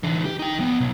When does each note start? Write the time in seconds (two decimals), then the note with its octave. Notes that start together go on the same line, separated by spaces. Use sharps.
0.03 D3 E3
0.25 G4
0.39 D#4 G5
0.59 F3 B3
0.80 B1